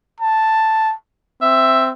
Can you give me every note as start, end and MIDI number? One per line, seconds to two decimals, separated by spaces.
0.20 0.94 81
1.42 1.92 60
1.42 1.89 76